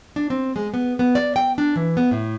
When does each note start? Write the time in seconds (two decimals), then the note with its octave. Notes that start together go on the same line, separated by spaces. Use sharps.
0.16 D4
0.30 C4
0.56 G#3
0.74 B3
0.99 B3
1.15 D5
1.36 G5
1.58 D4
1.76 E3
1.97 B3
2.11 A2